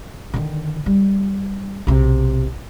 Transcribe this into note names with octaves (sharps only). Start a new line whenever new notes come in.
D3 D#3
G3
B1 C3